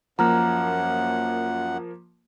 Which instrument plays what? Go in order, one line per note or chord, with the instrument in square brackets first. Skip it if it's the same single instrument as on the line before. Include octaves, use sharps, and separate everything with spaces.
[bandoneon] F#2 F#5 [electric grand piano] F3 A#3 [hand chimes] A#5 F6